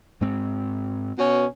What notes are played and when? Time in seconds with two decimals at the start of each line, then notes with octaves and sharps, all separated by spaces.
0.21 G#2 G#3 C4
1.19 B2 C#4